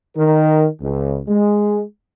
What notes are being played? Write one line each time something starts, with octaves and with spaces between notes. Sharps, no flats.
D#3 A#4
C#2
G#3